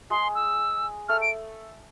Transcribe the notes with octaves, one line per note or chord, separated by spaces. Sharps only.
G#3 G#4 C6
E6
A3 A4 F6
D7